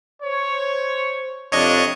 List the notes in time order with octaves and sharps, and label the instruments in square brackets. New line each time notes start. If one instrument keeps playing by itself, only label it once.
[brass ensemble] C5 C#5
[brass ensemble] F2 C3 D4 [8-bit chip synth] C#5 D#5 C#6